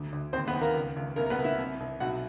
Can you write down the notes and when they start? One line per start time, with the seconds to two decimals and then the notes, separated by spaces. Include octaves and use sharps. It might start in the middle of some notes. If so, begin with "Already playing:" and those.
Already playing: D2
0.13 D2
0.33 D#2 C4 C5
0.48 B3 B4
0.54 D#2
0.61 A#3 A#4
0.74 C#2
0.96 C#2
1.16 C2 A#3 A#4
1.26 A#4
1.30 B3 B4
1.38 C2
1.44 E4 E5
1.59 C2
1.80 C2
2.00 B1 F#4 F#5